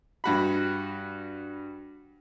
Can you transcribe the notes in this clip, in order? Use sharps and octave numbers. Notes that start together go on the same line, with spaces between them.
G2 F#4 B5